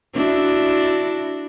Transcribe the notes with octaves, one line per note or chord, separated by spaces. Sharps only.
D4 E4 F#4